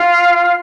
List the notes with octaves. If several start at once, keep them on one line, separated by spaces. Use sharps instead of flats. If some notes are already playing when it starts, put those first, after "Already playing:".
Already playing: F4